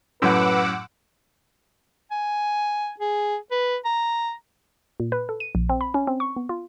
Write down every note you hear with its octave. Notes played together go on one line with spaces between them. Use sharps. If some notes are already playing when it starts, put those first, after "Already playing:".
F#2 A2 B4 F#5 D6 E6
G#5
G#4
B4
A#5
A#2
B4
A4
D#7
A#1
C4
B5
C#4
C4
C#6
B3
F4